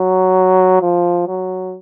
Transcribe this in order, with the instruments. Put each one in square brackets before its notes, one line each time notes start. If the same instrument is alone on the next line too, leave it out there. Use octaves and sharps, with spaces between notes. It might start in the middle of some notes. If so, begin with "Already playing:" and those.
Already playing: [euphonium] F#3
F3
F#3